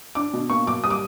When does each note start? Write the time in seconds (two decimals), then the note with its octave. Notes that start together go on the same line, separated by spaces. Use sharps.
0.15 D4 D6
0.34 B2
0.50 A#3 C#6
0.66 F#3 D6
0.84 G3 D#6
0.90 D6